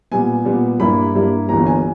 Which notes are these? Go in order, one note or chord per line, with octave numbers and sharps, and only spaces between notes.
A#2 G3 B3 G#5
A#2 G3 B3
G2 G3 A#3 E4 B5
G2 G3 A#3 E4
G1 G2 E3 A#3 A#5
G#5